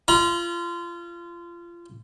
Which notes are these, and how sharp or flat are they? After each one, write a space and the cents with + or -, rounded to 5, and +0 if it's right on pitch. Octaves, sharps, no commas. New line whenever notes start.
F4 -25 A#5 +45